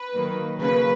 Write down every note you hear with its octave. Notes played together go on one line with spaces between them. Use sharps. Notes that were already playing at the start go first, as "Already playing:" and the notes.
Already playing: B4
D#3 F#3 A#3
C#3 F#3 A#3 B4